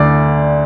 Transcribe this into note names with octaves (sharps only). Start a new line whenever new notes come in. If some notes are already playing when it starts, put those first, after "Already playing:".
Already playing: D2 D3 D5